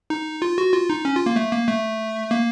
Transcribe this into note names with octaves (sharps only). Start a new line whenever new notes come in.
D#4
F4
F#4
F4
D#4
C#4
F4
A#3
A3
A#3
A3
A#3